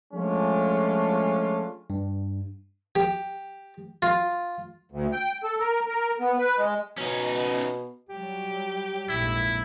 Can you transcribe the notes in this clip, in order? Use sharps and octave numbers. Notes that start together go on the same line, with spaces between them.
F3 G#3 A3 C#4 D4 F4
G2
G4
F4
D2
G5
A4
A#4
A#4
B3
B4
G#3
B2 C#4 D#4
F#3 G3 G4
A#1 F2 G#2 E4